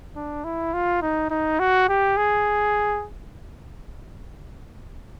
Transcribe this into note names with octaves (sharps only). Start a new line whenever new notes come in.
D4
E4
F4
D#4
D#4
F#4
G4
G#4